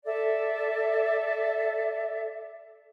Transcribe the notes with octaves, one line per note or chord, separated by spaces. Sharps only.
A4 D5 E5